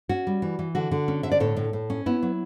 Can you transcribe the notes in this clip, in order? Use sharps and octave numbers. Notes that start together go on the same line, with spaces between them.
C#4 F#4
G3
E3
E3
D3 F#4
D3
C#4
D3 E5
D5
A2 A4 C#5
A2
A2
C#4
B3 E4
F#3